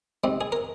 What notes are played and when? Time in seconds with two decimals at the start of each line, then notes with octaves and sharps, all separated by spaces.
0.24 G#2 G3 C4
0.41 G#4
0.52 A#4